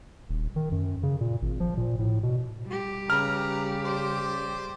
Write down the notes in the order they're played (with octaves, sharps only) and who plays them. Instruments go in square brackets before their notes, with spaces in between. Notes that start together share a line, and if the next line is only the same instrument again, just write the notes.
[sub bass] D#1
D#3
F#2
C#3
A#2
G#1
F3
A#2
A2
B2
[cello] G3 G4
[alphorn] C#3 [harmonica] B4 A#5 [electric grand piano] F6
[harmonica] C5 D5